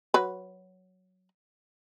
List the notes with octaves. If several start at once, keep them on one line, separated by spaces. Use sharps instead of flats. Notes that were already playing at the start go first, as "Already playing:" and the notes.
F#3 B4